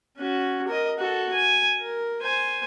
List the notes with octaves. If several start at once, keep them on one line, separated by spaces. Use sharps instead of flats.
C#4 F#4
A#4 D#5
F#4 A4
G#5
A#4
C5 G#5